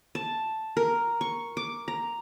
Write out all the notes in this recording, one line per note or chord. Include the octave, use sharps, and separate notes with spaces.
A5
A#4
C#6
D6
A#5